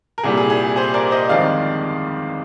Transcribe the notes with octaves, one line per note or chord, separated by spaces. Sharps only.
A#4
C2 A#2 G3 G#4
G#4
G#4
G#4 C5
A#4 D5
C5 D#5
G1 F2 D#3 G#3 D5 F5